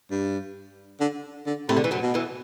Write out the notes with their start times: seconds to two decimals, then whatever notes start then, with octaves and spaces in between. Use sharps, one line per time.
0.11 G2
1.00 D3
1.46 D3
1.69 A2 C3 A3
1.77 D3
1.84 E3
1.91 F#2 F#3
2.02 B2
2.14 E2 E3